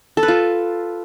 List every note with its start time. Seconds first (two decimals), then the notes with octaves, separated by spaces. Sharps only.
0.17 A4
0.23 B4
0.28 F4